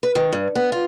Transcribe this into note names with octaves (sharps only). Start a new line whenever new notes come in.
B4
D#3
G2
B3
F4